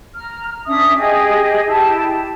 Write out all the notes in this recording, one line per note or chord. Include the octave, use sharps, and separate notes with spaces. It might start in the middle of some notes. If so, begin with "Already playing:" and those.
A#5 F6
C#4 D4 E5 D#6
G4 G#4 D#5
E4 G4 A5